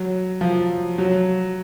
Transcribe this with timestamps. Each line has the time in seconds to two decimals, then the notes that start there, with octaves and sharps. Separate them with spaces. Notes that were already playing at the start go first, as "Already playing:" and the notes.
Already playing: F#3
0.41 F3
0.98 F#3